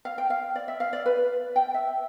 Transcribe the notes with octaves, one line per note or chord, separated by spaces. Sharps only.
F5
G5
F5
D5
E5
F5
D5
B4
G5
E5